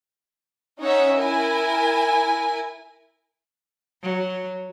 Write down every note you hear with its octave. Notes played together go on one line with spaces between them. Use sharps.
C#4 D#4 C#5 E5 F#5
E4 A#4 G#5
F#3